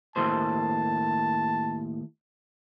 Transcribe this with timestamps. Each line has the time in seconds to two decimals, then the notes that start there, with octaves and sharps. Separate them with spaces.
0.16 D#2 A2 C5 A5